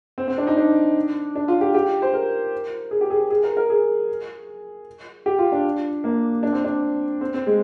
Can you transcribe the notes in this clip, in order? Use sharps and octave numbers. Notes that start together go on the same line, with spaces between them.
C4
C4
D4
D#4
D4
D4
F4
G4
G4
C5
A#4
G#4
G4
G#4
G#4
A#4
A#4
G#4
G4
F4
D4
A#3
D4
C4
D4
C4
C4
G#3